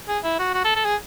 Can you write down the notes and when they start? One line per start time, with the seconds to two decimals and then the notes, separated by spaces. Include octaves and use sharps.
0.08 G#4
0.23 E4
0.39 F#4
0.54 F#4
0.65 A4
0.76 A4
0.85 G#4